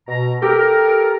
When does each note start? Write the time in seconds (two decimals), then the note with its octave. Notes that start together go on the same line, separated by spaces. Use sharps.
0.08 B2 A#5
0.42 G4 A4 A#4